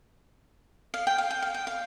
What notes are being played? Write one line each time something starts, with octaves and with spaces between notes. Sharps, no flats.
F5
G5
F5
G5
F5
G5
F5